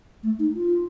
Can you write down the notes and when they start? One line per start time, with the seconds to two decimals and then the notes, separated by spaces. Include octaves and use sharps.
0.23 A3
0.39 D#4
0.55 F4